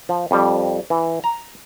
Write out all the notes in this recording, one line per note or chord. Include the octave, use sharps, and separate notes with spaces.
F3
F2 G3
E3
A#5